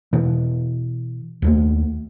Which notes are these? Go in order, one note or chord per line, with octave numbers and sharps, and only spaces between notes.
B2 E3
D#2 G3 A3